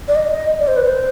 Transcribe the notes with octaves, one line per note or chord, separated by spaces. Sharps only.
D5
D#5
D5
C5
B4
C5